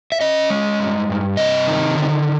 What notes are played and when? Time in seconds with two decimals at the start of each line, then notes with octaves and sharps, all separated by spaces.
0.12 E5
0.21 C#4 D#5
0.50 G#3
0.80 G2
1.09 G2
1.37 C3 D#5
1.68 D#3
1.96 D3